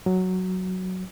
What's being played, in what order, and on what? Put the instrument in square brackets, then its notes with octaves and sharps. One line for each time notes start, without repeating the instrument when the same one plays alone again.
[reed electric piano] F#3